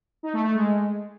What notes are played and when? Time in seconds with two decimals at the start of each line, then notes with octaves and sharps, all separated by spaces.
0.23 D#4
0.33 A3
0.44 A3
0.55 G#3